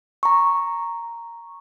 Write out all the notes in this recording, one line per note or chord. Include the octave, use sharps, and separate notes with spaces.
A#5 C#6